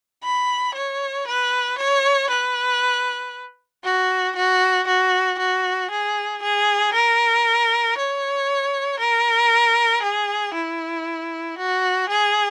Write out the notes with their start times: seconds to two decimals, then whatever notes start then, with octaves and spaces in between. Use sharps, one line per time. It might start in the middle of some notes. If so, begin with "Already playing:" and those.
0.24 B5
0.75 C#5
1.28 B4
1.79 C#5
2.30 B4
3.84 F#4
4.36 F#4
4.87 F#4
5.39 F#4
5.91 G#4
6.43 G#4
6.94 A#4
7.98 C#5
9.00 A#4
10.03 G#4
10.54 E4
11.58 F#4
12.10 G#4